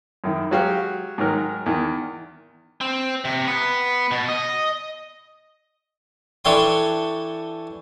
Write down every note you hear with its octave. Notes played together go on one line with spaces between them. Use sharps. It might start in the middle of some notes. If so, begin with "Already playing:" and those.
F#2 D#3 E4
F#3 G#3 F#4 G4 F5
G#2 D#3 F#3 A#4
E2 D#3
C4
C3
B3 B4
B2
D#5
E3 D4 A4 C#5 G5 C6